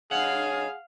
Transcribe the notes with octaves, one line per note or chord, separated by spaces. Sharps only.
G2 B2 C#4 G#4 F5 F#5